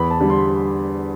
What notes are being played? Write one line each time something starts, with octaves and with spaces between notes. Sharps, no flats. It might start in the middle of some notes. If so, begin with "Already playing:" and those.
Already playing: E2 B5
A5
D3 G3
C6